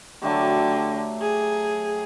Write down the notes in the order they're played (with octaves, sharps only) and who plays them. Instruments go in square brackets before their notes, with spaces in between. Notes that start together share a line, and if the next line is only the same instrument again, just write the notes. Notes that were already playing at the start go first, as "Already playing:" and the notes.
[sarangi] D3 [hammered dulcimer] F#3 A3 G4
[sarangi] G#4